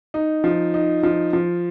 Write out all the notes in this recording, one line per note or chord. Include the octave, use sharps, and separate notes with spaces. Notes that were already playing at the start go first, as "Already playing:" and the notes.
D#4
F3
D#4
F3
F3